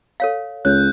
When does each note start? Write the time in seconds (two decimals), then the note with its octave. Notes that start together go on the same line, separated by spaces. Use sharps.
0.20 A4 C#5 F5
0.65 C#2 C#5 F#6 G6